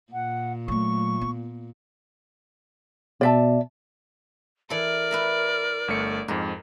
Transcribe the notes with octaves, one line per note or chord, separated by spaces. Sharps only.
A#2 F#5
F#3 A3 C#6
B3
B2 D5 E5 A5
E3 A4 A#4 D5
B4 E5 A#5
G1 A3 C#7
F2 G#2 A#4